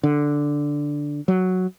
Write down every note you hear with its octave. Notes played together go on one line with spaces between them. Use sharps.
D3
F#3